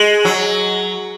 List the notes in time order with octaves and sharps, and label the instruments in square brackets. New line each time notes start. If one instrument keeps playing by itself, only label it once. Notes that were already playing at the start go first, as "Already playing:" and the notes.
Already playing: [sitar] G#3
F#3